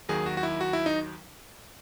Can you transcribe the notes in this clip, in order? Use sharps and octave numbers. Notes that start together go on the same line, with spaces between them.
D#2 D#3 F#3 G#4
F#4
F#4
E4
F#4
E4
D#4